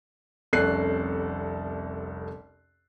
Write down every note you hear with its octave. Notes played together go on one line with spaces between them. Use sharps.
F1 C2 C#4 A4 F#6 C7